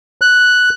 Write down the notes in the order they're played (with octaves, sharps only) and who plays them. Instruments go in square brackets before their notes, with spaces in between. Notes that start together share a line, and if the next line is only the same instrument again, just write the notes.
[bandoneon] F#6